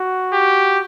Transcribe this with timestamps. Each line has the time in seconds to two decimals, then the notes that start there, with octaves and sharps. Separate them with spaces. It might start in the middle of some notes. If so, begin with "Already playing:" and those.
Already playing: F#4
0.33 G4